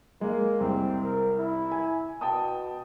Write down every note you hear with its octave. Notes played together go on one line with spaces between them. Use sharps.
G#3 A#3
C2 C4
A#4
E4
G#5
B2 G5 A5 D#6